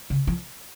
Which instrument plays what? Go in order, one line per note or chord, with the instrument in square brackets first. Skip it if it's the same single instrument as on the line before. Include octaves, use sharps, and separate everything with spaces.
[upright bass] C#3
F3